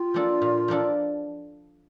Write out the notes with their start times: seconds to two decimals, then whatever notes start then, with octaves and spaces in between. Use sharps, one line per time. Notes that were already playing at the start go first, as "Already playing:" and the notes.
Already playing: F4 G4
0.14 F3 A#3 D4 A4
0.41 A#2
0.68 F3 A#3 D4 A4